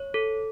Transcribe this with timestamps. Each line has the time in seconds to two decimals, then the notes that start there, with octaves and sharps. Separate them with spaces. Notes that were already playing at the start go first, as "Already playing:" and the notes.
Already playing: C#5
0.14 A4